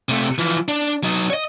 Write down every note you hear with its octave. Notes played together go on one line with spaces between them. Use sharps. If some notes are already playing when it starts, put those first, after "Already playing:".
C3 A3
E3 F3
D4
F#3 D#4
C#5 D#5